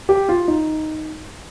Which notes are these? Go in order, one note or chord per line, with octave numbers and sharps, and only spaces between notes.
G4
F4
D#4